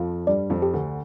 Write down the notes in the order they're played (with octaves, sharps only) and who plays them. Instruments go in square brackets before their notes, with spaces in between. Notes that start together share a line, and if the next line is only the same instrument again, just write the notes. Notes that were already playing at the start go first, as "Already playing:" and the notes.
Already playing: [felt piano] F2 F3 [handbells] F5
[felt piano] G2 G3 [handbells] D5
[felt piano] F2 F3
[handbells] G4
[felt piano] D2 D3